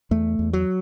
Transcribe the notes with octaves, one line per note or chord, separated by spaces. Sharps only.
E2 A3
E2
F#3